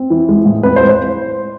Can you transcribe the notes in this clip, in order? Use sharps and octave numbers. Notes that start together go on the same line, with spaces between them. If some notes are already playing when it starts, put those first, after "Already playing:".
Already playing: C4
E3
G#3
A2
C4 B4
C5
G#3
C5